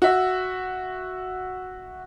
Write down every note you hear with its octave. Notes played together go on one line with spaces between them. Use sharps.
F#4 E5